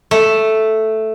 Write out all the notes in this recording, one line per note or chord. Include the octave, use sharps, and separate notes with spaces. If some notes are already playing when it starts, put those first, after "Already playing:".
A3